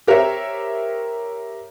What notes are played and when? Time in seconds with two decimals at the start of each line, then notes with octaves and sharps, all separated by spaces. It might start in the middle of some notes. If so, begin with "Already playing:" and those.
0.07 G4 A#4 C5 C#5 E5